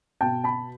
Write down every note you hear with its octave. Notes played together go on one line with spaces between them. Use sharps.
B2 G5 A5
A5 B5